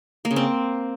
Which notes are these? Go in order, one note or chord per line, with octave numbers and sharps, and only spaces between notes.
A#3
C#3
C4